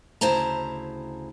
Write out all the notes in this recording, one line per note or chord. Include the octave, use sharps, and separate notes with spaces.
D2 C#3 E4 C5 A5 A#5